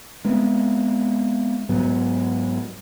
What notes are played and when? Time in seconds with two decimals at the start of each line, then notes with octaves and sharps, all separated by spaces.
0.25 G#3 B3 C4
1.69 G#2 F#3 B3